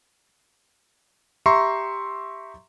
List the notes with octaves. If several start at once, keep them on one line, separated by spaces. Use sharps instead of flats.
G4 E5 A#5 C6 C#6